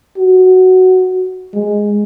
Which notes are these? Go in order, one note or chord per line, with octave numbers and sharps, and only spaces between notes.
F#4
G#3